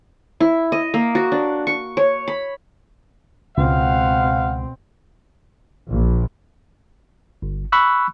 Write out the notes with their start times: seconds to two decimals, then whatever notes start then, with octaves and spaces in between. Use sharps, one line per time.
0.40 E4
0.72 D#5
0.94 A#3
1.15 F#4
1.32 D4
1.67 C#6
1.97 C#5
2.28 B5
3.58 C#2 B2 C4 F5 F#5
5.90 A#1
7.42 G1
7.72 B5 C#6 E6 F#6